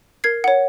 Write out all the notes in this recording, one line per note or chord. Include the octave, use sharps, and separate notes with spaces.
A#4 G#6 C7
C#5 F#5